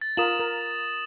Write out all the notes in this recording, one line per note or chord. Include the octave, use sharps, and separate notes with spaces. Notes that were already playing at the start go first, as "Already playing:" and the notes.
A6
F4 A#4 D#6 E7 F#7
A#4